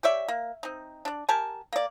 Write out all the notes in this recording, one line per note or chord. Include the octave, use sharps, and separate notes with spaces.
G4 C#5 D5 E5
A#3
C4 D#4
D4 D5
G4 A#4 G#5 A5
A#3 D5